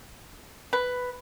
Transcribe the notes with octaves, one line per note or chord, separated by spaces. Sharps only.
B4